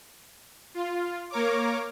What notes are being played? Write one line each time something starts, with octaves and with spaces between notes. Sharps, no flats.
F4
A#3 A#4 C#5 D6